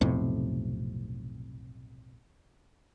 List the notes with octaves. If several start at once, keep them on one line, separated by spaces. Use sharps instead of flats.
B1 F2 A2 C3